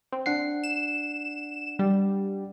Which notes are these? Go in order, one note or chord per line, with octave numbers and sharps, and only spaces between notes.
C4
D4 F#5 C7
E7
G3